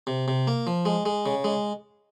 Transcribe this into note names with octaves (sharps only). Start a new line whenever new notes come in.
C3
C3
A#3
F3
G#3
G#3
C#3
G#3